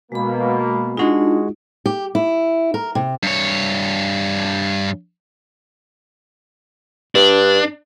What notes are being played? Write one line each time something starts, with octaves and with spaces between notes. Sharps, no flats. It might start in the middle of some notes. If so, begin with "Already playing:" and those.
B2 G#3 A#3 B5
G#3 D4 D#4 F4 F#4 G#4
G4
E4
A#4
C3
G2 C#5
G2 D4